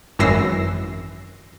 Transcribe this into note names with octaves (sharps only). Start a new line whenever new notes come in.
G#1 F#2 E3 E6 A#6 C7